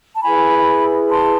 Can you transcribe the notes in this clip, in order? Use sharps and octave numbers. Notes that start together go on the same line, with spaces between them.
A5
E4 G#4 B4 G#5 B5
A5 C6